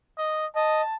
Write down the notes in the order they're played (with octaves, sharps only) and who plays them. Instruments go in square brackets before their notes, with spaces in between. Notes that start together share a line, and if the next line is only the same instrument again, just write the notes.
[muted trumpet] D#5
[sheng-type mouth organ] D#5 [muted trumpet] A5